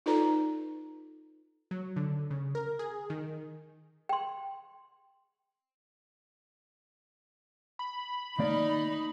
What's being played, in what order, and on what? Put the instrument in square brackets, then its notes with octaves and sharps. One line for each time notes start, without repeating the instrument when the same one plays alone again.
[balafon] D#4 F4 A4 B4 D5 A#5
[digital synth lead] F#3
D3
C#3
A#4
G#4
D#3
[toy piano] G5 C6
[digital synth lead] B5
[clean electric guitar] D#3 A#3 D5 [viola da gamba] D#4